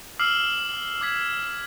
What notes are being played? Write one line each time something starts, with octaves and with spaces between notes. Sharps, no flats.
D6 E6 F6 C7 F#7
D6 G#6 B6